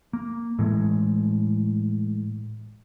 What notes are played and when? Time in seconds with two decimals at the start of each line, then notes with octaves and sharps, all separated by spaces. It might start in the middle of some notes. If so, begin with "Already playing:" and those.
0.13 A#3
0.59 A2 E3 G#3